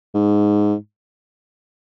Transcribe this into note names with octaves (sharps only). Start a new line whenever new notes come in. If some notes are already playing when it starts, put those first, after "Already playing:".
G#2